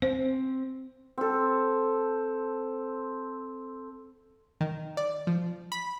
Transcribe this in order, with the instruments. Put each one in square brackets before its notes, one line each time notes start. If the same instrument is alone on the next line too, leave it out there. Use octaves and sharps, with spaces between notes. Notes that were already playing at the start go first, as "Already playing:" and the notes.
[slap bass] C4 [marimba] C5
[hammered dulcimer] C4 A4
[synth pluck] D#3
D5
F3
B5